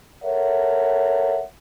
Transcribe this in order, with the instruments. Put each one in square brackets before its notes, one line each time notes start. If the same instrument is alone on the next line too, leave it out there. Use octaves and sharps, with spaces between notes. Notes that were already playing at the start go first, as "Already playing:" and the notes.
[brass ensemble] A4 A#4 C#5 E5 F#5